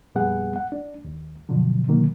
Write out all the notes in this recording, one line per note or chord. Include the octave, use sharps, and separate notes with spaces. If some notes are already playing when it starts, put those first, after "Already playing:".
F2 A#2 G3 B3 G#4 F#5
F#5
D4
D#2
G2 B2 D3 F3 F#3
B2 D3 D#3 F#3 A#3